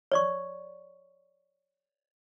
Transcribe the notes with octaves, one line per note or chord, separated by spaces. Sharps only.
C#5 D5 C#6